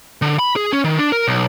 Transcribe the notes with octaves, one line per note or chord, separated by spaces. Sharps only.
D3
B5
G#4
C#4
D#3
D4
A#4
B1